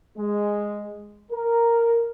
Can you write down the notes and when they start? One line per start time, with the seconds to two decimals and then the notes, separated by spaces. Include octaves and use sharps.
0.18 G#3
1.31 A#4